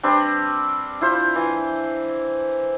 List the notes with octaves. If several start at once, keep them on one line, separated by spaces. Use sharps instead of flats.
G3 C4 D4 B4
E4 F4 C5
E3